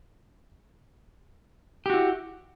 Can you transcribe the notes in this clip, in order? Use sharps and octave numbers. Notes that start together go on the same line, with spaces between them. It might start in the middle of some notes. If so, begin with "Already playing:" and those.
E4 F#4 G4